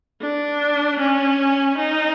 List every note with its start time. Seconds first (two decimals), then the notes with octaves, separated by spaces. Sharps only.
0.21 D4
0.99 C#4
1.78 D#4